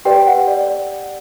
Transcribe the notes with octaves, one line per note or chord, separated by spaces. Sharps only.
G4 B4 D5 G5
F#5
D5
D5